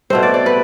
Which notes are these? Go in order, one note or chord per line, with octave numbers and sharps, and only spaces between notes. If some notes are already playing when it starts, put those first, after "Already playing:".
B2 A3 C4 C5
D5
D5
B4